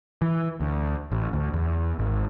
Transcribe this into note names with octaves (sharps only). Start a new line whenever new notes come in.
E3
D2
A1
D2
E2
G#1